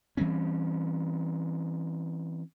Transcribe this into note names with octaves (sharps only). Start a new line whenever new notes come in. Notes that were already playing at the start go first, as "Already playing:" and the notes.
E3 G3 C4 C#4